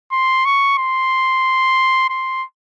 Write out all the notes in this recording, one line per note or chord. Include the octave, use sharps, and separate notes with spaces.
C6
C#6
C6
C6